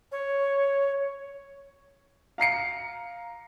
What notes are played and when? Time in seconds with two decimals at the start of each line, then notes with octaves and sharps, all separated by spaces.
0.12 C#5
2.38 F5 A#5 C7 C#7